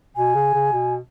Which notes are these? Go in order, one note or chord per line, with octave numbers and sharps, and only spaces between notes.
B2 G#5
C#3
C#3
B2